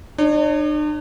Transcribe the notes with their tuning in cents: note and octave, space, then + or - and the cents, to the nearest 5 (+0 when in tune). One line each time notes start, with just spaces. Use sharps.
D4 +45 C#5 +0